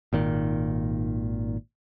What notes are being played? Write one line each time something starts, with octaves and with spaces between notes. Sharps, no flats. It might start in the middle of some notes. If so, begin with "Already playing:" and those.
G#1 A#2 D#3